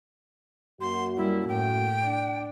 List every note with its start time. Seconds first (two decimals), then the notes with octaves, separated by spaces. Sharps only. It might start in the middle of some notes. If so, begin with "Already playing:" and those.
0.81 F#2 A#3 F#4 C6
1.17 G3 E4
1.48 A2 G5
2.04 D4